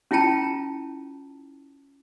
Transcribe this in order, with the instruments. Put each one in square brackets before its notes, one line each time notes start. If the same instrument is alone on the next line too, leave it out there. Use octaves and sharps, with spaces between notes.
[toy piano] C#4 E4 F4 G5 A5 A#5